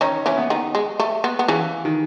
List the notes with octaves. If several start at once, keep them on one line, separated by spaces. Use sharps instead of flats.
D#3 C#4 D#4
E3 C#4 E4
B3
D#3 D#4
G#3
A3
B3
B3
C#3 E3 C#4
D#3